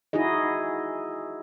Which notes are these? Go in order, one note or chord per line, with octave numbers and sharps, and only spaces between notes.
D#4 E4 F#4 G#4 D#5